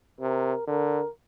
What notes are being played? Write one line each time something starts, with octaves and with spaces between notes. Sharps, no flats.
C3 A#4
D3 A#4